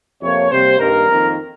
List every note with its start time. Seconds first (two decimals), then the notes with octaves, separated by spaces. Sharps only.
0.21 F2 C3 F3 A#3 C#5
0.50 C3 G3 A#3 C5
0.79 G2 D#3 G3 A#3 A#4
1.08 F2 D#3 A#3